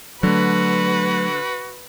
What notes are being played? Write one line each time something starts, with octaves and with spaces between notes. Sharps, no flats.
D3 F#3 A3 F#4 B4